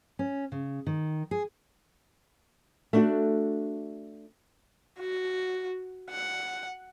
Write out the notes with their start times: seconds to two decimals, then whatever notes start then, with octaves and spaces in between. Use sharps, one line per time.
0.19 C#4
0.52 C#3
0.87 D#3
1.31 G#4
2.93 A3 D4 F#4
4.99 F#4
6.10 F#5